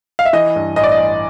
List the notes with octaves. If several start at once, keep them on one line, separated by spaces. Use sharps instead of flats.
F5
E5
E3 D#5
G2
A1 D#5
D5
D#5
A1